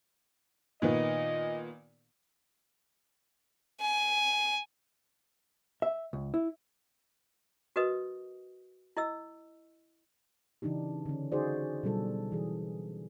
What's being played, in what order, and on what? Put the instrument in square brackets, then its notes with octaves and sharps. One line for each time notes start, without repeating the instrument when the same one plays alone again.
[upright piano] A#2 D#3 B3 [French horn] D#5
[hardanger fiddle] G#5
[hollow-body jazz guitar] E5
C#2
E4
[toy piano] F#4 A#4 B4 D#5 D#6
E4 D#5 E6
[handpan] C#3 E3 D4 D#4 G4
D3 C#4
D#4 F#4 G#4 C5 D5
B2 F#3 G3 D4 A4
E3 G#4